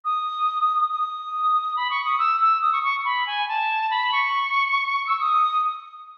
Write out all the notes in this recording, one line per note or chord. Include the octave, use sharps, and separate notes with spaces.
D#6
D#6
B5
C#6
D#6
E6
E6
D#6
C#6
C#6
B5
G#5
A5
B5
C#6
E6
D#6